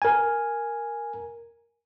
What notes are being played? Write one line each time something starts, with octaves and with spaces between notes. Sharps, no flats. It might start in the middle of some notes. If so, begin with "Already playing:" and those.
A#4 G#5